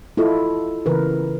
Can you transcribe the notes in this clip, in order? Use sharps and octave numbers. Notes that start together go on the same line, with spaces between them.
E4 F4 A4 D#5
C#3 E3 A#4 B4